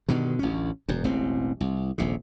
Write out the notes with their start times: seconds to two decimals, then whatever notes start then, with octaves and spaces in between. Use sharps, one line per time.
0.09 G2 B2 D3 D#3
0.39 A1 D2 C#4
0.88 E1 F#2
1.04 E1 A1 B2 C4
1.61 C2
1.98 D#1 A#1 C3